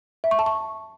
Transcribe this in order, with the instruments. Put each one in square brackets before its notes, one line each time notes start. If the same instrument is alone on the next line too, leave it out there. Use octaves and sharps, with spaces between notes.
[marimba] E5
C#6
A5
C#6